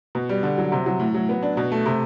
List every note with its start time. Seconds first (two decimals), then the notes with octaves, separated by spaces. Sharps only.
0.15 B2
0.29 G3
0.43 D3
0.58 F#3
0.72 C3
0.86 F#3
1.00 A2
1.14 F#3
1.29 B3
1.43 D4
1.57 B2
1.72 A3
1.86 C3